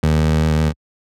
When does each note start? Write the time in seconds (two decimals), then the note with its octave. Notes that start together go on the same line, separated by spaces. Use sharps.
0.03 D#2